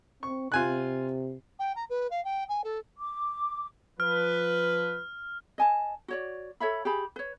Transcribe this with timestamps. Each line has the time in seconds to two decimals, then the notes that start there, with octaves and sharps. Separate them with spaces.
0.23 C4 C#6
0.52 C3 F4 G#5 F#6
1.59 G5
1.76 A#5
1.90 B4
2.11 F5
2.25 G5
2.49 G#5
2.64 A4
2.98 D6
4.00 F3 B4 F6
5.58 D#5 G#5 A5
6.08 F#4 C#5 D5
6.60 A4 C#5 E5 B5
6.85 G4 G#4 B5
7.16 B4 C#5